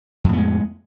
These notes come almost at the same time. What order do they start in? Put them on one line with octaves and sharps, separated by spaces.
F2 A2 B3 G#3